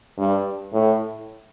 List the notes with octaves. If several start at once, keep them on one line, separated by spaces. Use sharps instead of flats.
G2
A2